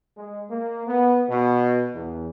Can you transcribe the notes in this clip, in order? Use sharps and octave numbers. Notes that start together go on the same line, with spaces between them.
G#3
A#3
B3
B2
E2